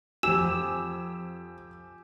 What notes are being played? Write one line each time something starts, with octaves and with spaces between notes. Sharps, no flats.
F2 G4 G#5 E6 E7